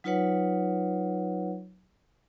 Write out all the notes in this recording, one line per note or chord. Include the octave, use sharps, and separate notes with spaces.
F#3 D#4 F4 B4 C#5 F#5